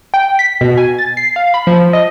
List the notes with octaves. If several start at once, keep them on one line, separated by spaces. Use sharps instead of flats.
G5
B6
B2
G#5
A6
C7
F5
B5
F3
D#5